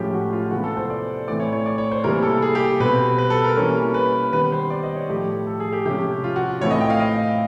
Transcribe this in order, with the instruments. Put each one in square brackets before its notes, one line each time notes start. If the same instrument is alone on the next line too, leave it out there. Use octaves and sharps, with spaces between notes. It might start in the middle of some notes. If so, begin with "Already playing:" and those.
Already playing: [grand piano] A2 F3 G#3 C#4 G4
F#4
F4
C3 E3 G#3 B3 F#4
A4
C5
D5
A2 E3 A3 C4 D5
C#5
C#5
D5
C#5
C5
C3 E3 G3 A#3 A#4
A4
G#4
G4
B2 G3 C4 B4
B4
A4
A#4
E3 G3 A#3 C#4 A#4
B4
D#3 G3 B3 B4
C5
D5
D#5
C#5
A2 F3 A3 G4
A4
G#4
G4
C3 F3 G#3 C#4 G4
F4
F#4
A2 E3 A3 C4 C#5
D#5
G5
F5
D#5